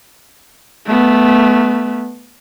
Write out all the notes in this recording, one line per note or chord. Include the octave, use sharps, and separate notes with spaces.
A3 B3